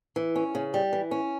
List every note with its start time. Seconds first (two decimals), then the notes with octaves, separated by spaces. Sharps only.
0.16 E3
0.36 C#4
0.55 C#3
0.74 G3
0.93 E3
1.11 C#4